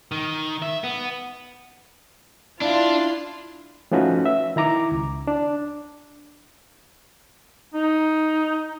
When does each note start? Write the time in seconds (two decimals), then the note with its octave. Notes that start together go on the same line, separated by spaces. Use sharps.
0.11 D#3
0.62 E5
0.84 B3
2.61 D4 E4 F4 C6
3.92 F3 A3 C#4 D#4 F#4 B4
4.26 E5
4.56 D#3 E4 A#5 D6
4.91 C#2
5.27 D4
7.74 D#4